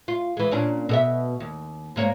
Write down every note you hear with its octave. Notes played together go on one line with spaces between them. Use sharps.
F4
E3 G#3
A#2 C#4 D4
B2 A4 E5
D#2
G#2 A#3 C#5